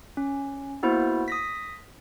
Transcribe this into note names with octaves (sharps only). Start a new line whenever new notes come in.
C#4
A#3 B3 E4 F#4 C5
D#6 A#6 B6